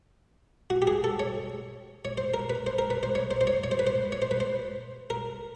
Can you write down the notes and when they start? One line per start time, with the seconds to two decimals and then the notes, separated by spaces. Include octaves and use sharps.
0.70 F#4
0.82 G4
0.87 G#4
1.04 A4
1.19 C#5
2.05 C#5
2.18 C5
2.34 A#4
2.50 B4
2.67 C5
2.79 A#4
2.90 B4
3.03 C5
3.15 C#5
3.31 C5
3.41 C5
3.47 C#5
3.64 C#5
3.71 C5
3.79 B4
3.87 C5
4.12 C#5
4.22 C5
4.31 B4
4.40 C5
5.10 A#4